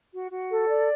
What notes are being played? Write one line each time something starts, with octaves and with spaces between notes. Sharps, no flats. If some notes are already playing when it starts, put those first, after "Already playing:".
F#4
F#4
A4
D5